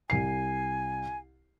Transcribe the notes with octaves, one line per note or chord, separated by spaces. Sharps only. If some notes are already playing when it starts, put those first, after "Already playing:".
C2 G#5 C7